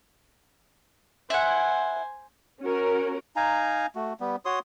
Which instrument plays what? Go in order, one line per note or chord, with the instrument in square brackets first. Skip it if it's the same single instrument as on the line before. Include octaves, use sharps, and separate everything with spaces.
[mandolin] E4 F#5 [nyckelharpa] C5 G#5
[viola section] C#4 F#4 A#4
[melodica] D#4 F5 G#5 A#5
A3 F#4
G3 B3
F#4 C#5 C6 D#6